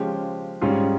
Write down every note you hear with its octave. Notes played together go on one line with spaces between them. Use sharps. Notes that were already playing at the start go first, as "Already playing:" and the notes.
Already playing: C#3 F3 G#3 C#4 G4
G#2 G3 C#4 F4 G#4